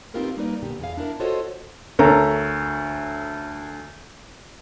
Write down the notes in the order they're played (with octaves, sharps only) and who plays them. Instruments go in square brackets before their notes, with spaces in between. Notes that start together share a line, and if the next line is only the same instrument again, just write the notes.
[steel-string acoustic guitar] C4 D#4 F4 G4 A#4 B4
G3 A#3 D#4 A#4 B4 D5
A#2 D3 B3 G4
E2 G#4 F5
D4 E4 A#4
F4 F#4 A4 C5 C#5 D#5
[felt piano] D2 A4 A#4 C#5 A#5